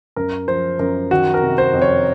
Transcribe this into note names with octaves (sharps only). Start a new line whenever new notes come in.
F#2 A#4
F3 C5
F#2 A#4
D#3 F#4
A#4
C3
C5
F2
C#5